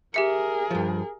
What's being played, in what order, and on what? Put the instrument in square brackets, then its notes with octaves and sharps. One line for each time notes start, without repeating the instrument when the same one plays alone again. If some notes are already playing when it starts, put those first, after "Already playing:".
[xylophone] G4 E5 C#7 [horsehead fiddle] G#4 A#4
[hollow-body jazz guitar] G2 F3